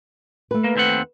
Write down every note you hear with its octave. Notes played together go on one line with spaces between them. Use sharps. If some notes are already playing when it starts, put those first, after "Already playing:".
A3 B4
A#3
D#2 C4 F#5